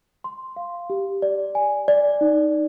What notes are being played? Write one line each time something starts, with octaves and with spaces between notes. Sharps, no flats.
C6
F5
G4
D5
G#5
D5
D#4